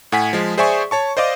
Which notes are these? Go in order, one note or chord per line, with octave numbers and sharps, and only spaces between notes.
A2 F#5 G#5 B6
F3 G#3 G#4
G#4 C5 D5 E5 G#5 C#6
C#5 A5 C#6
C5 D5 D#5 F5 D6